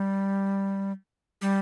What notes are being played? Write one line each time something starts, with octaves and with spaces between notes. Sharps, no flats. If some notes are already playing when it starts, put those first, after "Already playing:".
Already playing: G3
G3